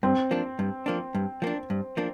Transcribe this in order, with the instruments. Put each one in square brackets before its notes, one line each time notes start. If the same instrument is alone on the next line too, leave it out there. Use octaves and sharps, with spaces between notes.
[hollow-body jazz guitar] G2 [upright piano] C4
[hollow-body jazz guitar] F3 A#3 D4
G2
F3 A#3 D4
G2
F3 A#3 D4
G2
F3 A#3 D4